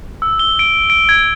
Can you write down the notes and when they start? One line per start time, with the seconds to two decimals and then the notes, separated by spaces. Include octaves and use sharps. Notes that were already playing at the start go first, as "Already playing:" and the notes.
0.22 E6
0.39 G7
0.59 D7
0.90 D7
1.09 G#6